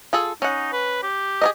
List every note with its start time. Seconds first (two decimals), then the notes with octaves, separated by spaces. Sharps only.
0.13 F4 G#4 A4
0.42 C#4 D#4 F#5
0.73 B4
1.03 G4
1.41 G#4 A#4 D#5